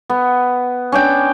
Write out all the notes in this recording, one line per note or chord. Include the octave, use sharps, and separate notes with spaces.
B3
C#4 D4 D5 G5